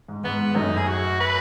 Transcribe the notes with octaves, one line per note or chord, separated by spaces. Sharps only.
G#2
G#2 B3
G#2
F#2 A2 D#4
G#4
F#4
B4